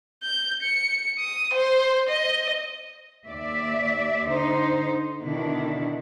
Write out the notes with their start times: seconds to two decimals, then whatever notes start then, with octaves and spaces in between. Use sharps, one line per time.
0.23 G6
0.63 C#7
1.20 D#6
1.54 C5
2.09 D#5
3.27 D#2 D5 E5
4.27 D3 D#4 C5
5.22 B2 D3 D#3 D4 E4